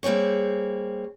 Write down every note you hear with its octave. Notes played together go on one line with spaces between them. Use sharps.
G3 A#3 C4 G#4 C#5